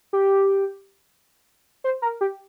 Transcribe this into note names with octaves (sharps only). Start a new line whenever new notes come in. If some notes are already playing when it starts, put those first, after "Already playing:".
G4
C5
A#4
G4